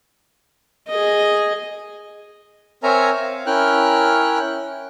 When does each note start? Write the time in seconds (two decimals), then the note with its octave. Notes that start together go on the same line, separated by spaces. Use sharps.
0.88 G#4 D#5
2.83 C4 A#4 C#5 E5 G#5 A#5
3.22 F5
3.46 C#4 E4 A#4 G5 F6 F#6